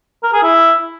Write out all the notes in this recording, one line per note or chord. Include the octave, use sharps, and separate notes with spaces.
A#4
G#4
E4